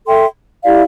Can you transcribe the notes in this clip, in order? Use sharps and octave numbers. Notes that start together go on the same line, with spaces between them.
A4 E5 G5 C6
E4 G4 D5 F5